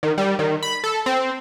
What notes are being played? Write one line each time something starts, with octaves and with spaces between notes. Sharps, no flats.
D#3
G3
D#3
B5
A4
C4